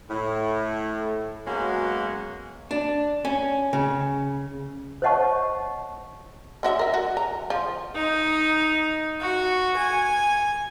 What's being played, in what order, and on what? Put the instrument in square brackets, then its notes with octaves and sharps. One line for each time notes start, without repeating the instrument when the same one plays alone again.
[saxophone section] A2
F#3 G#3 A#3 B3 C#4 F#4
[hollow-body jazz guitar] D4
C#4
C#3
[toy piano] C5 C#5 D#5 F#5 A5 C#6
[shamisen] D3 F#4 E5
A#4 E5
F#4
A#5
F3
[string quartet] D#4
F#4
G#5